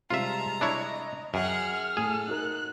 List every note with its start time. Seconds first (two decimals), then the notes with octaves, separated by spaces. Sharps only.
0.10 C3 G3 G#3 F4 E5 A5 A#5
0.61 D4 E4 C#5 D#5
1.34 F#2 G#4 F#5 G5 F6
1.97 A2 G#4 A4
2.27 D#4 F#4 A#4 F#6